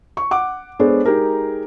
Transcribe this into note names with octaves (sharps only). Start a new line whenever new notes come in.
C#6
F#5 D6
G#3 B3 D4 A4 C5 C#5
G#3 D#4 G4 G#4 A#4